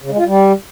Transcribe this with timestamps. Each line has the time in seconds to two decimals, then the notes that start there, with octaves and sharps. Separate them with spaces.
0.03 C#3
0.11 G#3
0.18 F4
0.26 G3